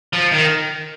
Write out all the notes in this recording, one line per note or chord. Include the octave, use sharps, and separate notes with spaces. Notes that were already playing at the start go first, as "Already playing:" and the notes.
F3
D#3